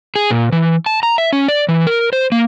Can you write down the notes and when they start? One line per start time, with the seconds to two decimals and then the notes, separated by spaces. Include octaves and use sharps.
0.16 G#4
0.30 A#2
0.52 E3
0.86 A5
1.03 A#5
1.18 E5
1.33 C#4
1.48 D5
1.69 E3
1.87 A#4
2.13 C5
2.32 A#3